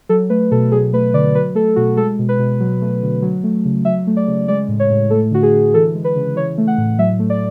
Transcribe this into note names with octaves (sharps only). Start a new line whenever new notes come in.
F#3 A4
A3 B4
B2 A4
F#3 G#4
A3 B4
D3 D5
F#3 B4
A3 A4
B2 F#4
G#3 A4
B2
B4
B2
F#3
A3
D3
F#3
A3
C#3
F#3 E5
A3
D5
C#3
G#3 D5
A2
C#5
A2
A3 A4
D3 F#4
G#4
D3
E3 A4
G#3
B4
C#3
E3 C#5
A3
F#5
A2
F#3 E5
A3
D5